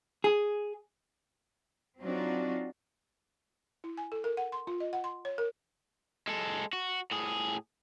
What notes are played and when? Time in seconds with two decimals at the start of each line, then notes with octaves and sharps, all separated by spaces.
0.24 G#4
2.01 F#3 C4 D4 D#4 F4 F#4
3.84 E4
3.98 G#5
4.12 A4
4.24 A#4
4.37 F#5
4.52 C6
4.67 F4
4.80 D#5
4.93 F#5
5.04 C6
5.25 C#5
5.38 A#4
6.28 G#3 A4
6.73 F#4
7.11 A2 G#4